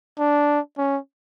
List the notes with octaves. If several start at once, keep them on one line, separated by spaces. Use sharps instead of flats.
D4
C#4